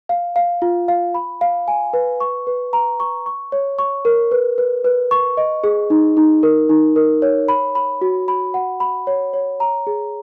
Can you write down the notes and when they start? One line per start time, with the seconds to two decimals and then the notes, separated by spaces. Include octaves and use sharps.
0.09 F5
0.36 F5
0.62 F4
0.88 F5
1.14 B5
1.41 F5
1.68 G#5
1.93 B4
2.20 C#6
2.47 B4
2.73 A#5
3.00 C#6
3.26 C#6
3.52 C#5
3.79 C#6
4.05 A#4
4.32 B4
4.58 B4
4.85 B4
5.11 C#6
5.37 D#5
5.64 G#4
5.90 D#4
6.17 D#4
6.43 A#4
6.69 D#4
6.96 A#4
7.22 C#5
7.48 B5
7.75 B5
8.01 F#4
8.28 B5
8.54 F#5
8.80 B5
9.07 C#5
9.33 C#5
9.60 A#5
9.87 G#4